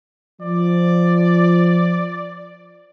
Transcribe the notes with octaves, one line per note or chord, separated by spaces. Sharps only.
F3 D5